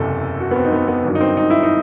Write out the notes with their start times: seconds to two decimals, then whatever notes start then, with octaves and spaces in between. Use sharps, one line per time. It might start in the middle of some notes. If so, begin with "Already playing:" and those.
Already playing: F#1 E2 C3 A4
0.40 F#4
0.51 B3
0.56 C4
0.65 D#4
0.73 B3
0.88 B3
1.05 G1 G2 D#3 F#3
1.15 D#4
1.21 C4
1.37 D#4
1.50 E4
1.63 D#4